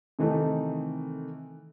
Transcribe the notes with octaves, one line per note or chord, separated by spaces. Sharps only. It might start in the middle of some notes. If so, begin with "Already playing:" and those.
C3 D#3 E3 A3 D#4 A4